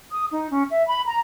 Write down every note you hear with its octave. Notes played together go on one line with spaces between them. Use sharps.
D#6
D#4
C#4
E5
B5
A#5